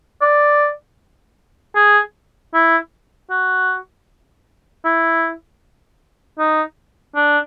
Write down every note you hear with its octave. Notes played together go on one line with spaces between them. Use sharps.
D5
G#4
E4
F#4
E4
D#4
D4